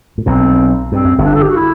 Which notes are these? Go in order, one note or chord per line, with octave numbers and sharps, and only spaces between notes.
A2
B1 B2 C4
G2 C4
F#2
G1 G2
D4
A4
G4
F#4
E4